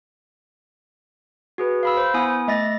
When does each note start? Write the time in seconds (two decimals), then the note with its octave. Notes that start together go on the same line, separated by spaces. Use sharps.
1.58 F#4 G#4 B4
1.83 F5 B5 E6
1.97 C5
2.14 B3 E4 G#5 D#6
2.47 A3 D#5 E5 A6 A#6